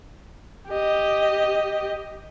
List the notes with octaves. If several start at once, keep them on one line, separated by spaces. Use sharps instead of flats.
G4 D#5